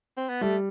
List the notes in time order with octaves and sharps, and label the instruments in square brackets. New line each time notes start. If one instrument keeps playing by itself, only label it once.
[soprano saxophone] C4
B3
[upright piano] G3 [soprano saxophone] A3